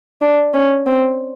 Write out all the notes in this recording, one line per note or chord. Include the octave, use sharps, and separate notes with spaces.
D4
C#4
C4